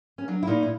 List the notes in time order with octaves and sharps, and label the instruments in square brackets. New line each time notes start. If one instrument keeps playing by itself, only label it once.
[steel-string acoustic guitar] C#4
F#3 D4
E4
A#2 D#4
E4